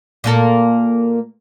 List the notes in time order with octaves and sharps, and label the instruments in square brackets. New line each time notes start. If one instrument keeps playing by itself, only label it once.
[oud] A#2 A#3 A4